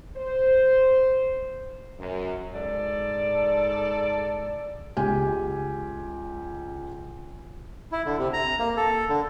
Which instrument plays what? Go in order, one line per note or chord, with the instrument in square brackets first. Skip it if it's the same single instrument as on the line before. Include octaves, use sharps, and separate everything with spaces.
[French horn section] C5
F#2
[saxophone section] G#2 A4 D5
[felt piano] C#2 G4 G#5
[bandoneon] E4
D3
C3
A#5
A#3
A4
D3